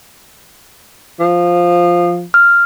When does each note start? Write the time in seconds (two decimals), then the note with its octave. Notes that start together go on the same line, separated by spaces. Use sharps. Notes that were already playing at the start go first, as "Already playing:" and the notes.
1.20 F3
2.34 F6